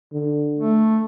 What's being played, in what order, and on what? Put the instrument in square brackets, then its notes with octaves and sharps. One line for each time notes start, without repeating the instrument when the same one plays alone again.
[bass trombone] D3
[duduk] A3